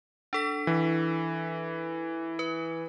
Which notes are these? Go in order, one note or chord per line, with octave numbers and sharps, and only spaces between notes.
D4 A4 B6
E3
B4